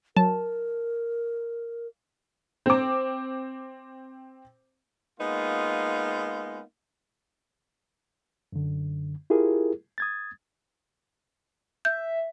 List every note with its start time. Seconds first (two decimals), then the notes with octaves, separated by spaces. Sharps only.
0.17 F#3 A#4 A5
2.66 C4 D6
5.19 G#3 A#3 B3 D#4 F4
8.53 F#2 D3
9.30 E4 F4 G4 G#4 A#4
9.98 D#6 G#6 A6
11.85 E5 G6